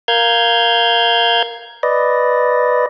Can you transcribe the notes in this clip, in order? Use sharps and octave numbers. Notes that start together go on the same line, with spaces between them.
A#4 F5 F6 G6 G#6
B4 D5 D#5